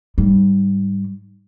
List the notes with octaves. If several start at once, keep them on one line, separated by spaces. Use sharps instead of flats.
G#2 G3